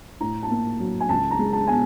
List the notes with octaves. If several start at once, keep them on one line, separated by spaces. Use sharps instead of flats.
A2 A#5
A5
A#3
F#3
G#5
C#2 A5
A#5
G#3
A5
B2 G#5